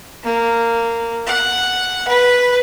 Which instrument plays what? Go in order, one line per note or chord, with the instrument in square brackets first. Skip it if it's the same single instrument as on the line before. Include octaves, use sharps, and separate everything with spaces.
[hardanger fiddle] A#3
F#5
B4